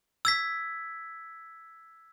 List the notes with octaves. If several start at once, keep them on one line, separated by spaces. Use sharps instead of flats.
E6 G#6 B6